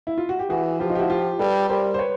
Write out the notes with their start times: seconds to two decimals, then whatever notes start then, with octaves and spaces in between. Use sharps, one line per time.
0.07 E4
0.18 F4
0.29 F#4
0.39 G4
0.50 E3 F#4 G#4
0.80 F3 F4 G4
0.90 D#4 F4
0.95 G4
1.00 E4 F#4
1.10 F4 G4
1.39 G3 A4 B4
1.69 G3 A#4 C5
1.94 C5
1.99 B4 C#5